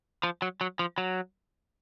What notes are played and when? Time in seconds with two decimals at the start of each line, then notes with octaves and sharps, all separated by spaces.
0.23 F3
0.42 F#3
0.61 F#3
0.79 F3
0.98 F#3